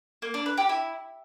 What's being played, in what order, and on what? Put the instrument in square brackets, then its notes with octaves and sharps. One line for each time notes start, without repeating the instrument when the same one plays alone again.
[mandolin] A#3
D4
B4
G4
E4